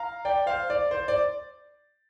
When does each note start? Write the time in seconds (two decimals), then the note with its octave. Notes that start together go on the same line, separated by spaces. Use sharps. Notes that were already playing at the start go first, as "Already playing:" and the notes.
Already playing: F5 A#5
0.25 D5 G5
0.46 C5 F5
0.70 D5
0.91 C5
1.08 D5